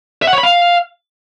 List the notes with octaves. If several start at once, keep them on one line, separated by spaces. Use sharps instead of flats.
E5
F#5
C#5
B5
F5